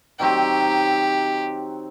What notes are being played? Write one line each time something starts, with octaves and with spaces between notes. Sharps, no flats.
D#3 F#3 C4 G4